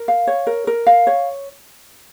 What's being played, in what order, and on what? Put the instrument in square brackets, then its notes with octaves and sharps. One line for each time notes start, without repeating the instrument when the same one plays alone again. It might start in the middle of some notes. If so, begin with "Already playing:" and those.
Already playing: [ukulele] A#4
F5
C#5
A#4
A#4
F5
C#5